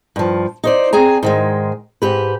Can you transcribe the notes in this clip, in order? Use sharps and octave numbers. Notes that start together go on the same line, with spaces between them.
G2 F3
D#4 C5 D5
C4 G#4 G#5 A#5
G#2 D#3 G#3
G#2 G4 B4